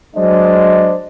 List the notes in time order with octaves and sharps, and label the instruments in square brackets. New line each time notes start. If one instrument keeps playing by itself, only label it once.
[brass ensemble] F#3 G#3 D4 C5 D#5